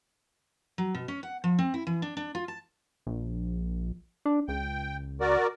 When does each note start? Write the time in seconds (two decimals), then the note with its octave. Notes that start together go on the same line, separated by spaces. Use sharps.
0.78 F#3
0.95 B2
1.08 C#4
1.23 F#5
1.44 F3
1.59 C4
1.74 E4
1.87 E3
2.02 D4
2.17 D4
2.35 F4
2.48 A5
3.07 A#1
4.25 D4
4.48 C#2 G5
5.21 F#4 A#4 D5